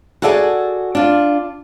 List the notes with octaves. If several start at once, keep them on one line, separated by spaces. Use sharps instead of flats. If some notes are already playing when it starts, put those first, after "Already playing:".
F#4 G#4 A4 D5 E5 G#5
D4 F4